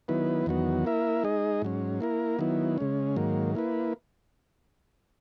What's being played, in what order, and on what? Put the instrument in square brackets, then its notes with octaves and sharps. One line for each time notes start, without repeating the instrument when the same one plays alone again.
[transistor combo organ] D#3 F#3 B3 E4 B4
E2 D#3 F#3 B3 F#4
A#3 E4 A#4 E5
G#3 D#4 G#4 D#5
G#2 F#3 C#4
A#3 E4 A#4
D#3 F#3 B3 E4
C#3 G#3 C#4
G#2 D#3 F#3 A#3
A#3 E4 B4